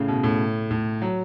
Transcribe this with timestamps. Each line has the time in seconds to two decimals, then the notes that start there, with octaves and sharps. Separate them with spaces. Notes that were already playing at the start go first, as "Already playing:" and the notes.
Already playing: A2 C#3
0.08 B2
0.23 A2
0.71 A2
1.02 F#3